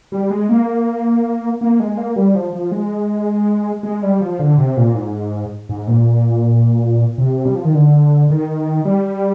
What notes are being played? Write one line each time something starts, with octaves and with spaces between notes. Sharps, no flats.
G3
G#3
A#3
A#3
G#3
A#3
G3
F3
F3
G#3
G#3
G3
F3
D3
C3
A#2
G#2
G#2
A#2
C3
G3
F3
D#3
D3
D#3
G3